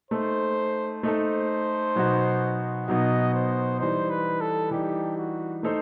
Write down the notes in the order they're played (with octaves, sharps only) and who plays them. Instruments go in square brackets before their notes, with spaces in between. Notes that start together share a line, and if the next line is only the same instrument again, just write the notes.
[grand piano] A3 D#4 A4 [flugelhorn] C5
[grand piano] A3 D#4 A4 [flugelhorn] C5
[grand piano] B2 F#3 B3 D#4 F#4
[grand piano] B2 F#3 B3 D#4 F#4 [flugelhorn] D#5
[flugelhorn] C5
[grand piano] E3 G3 D#4 [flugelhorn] C5
[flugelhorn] B4
A4
[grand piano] E3 G3 D#4 [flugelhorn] G4
[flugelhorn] F#4
[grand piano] A3 D#4 A4 C5